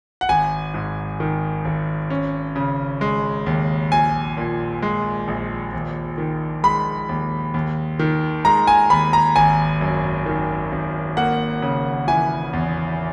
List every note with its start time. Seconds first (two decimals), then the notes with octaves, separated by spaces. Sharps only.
0.21 F#5
0.29 G#1 G#5
0.74 G#2
1.20 D#3
1.65 G#1
2.10 C#4
2.56 C#3
3.01 G#3
3.46 D#2
3.92 A#1 G#5
4.37 A#2
4.82 G#3
5.28 A#1
5.73 D#2
6.18 D#3
6.63 G#3 B5
7.09 D#2
7.54 D#2
7.99 D#3
8.45 G#3 A#5
8.67 G#5
8.90 D#2 B5
9.13 A#5
9.36 G#1 G#5
9.81 F#2
10.26 D#3
10.72 G#1
11.17 A#3 F#5
11.62 C#3
12.08 E3 G#5
12.53 E2